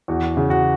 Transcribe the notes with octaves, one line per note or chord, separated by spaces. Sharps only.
E2 F#4
C#3
F#4